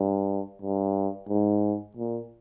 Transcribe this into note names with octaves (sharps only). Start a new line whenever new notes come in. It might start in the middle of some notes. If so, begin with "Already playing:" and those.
Already playing: G2
G2
G#2
A#2